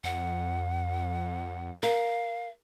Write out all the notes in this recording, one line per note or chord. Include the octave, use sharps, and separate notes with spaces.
F2 F#5
A#4 F5